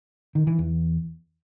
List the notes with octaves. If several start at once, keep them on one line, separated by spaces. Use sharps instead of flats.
D#3
E3
E2